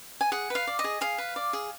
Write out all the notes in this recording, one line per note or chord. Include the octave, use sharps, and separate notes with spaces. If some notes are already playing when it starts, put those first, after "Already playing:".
G#5
G#4 F#5
B4 F5
D5
D#5
G#4
G#4 F5
B4
D5
G#4